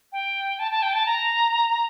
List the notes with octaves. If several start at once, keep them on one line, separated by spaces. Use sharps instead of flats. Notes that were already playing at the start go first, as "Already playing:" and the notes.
G5
A5
A5
G5
A5
A#5